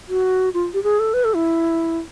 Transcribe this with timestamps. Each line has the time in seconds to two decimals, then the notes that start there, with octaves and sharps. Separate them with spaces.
0.09 F#4
0.54 F4
0.74 G4
0.83 G#4
0.99 A4
1.14 B4
1.25 A4
1.34 E4